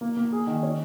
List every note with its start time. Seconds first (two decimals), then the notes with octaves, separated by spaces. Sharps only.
0.01 A#3
0.17 A#3
0.32 G#4
0.47 D#3
0.63 C#4